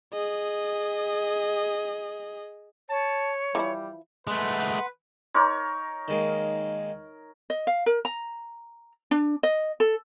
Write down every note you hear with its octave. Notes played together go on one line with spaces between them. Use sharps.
G#4 D#5
C#5 A5
E3 F3 G3 E4
G#3 A3 B4 F#5 C6
D#4 A#4 C#5 C6 D6
D#3 G#3 A#3
D#5
F5
A#4
A#5
D4
D#5
A4